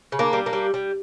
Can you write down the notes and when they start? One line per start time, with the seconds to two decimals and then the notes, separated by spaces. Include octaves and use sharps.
0.12 C#3
0.19 A#3 D4
0.33 G3
0.46 A#3 D4
0.53 G3
0.74 G3